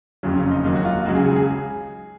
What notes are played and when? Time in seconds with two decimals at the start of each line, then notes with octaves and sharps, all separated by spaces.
0.23 F#1 F2 C#3 F#3 C#4
0.37 C#4
0.51 D#4
0.64 D#2 D#3 F#3 D#4
0.76 F#4
0.85 F4
1.05 C#2 C#3 F#3 F#4
1.15 G#4
1.26 G#4
1.36 G#4